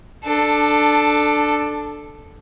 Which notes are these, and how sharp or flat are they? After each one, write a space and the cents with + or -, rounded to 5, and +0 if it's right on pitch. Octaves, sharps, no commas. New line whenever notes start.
D4 +15 A4 +0